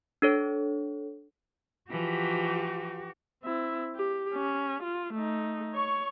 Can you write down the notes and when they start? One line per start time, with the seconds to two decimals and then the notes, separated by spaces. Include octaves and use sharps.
0.22 D4 A4 C#5
1.90 E3 F3 F#4 G4
3.43 C4 E4
3.96 G4
4.34 C#4
4.83 F4
5.14 A3 D#4
5.74 C#5 C#6